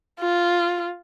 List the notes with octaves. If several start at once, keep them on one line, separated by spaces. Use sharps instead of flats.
F4